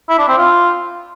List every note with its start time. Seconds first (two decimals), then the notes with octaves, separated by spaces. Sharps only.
0.09 E4
0.19 D4
0.28 C4
0.38 F4